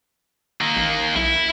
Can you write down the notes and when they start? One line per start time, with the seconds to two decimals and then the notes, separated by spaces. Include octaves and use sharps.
0.61 D#3 A#3
0.77 A1
1.16 B1 E4